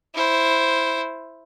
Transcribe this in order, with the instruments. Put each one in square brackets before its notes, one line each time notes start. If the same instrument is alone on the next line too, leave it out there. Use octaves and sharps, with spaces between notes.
[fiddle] E4 C5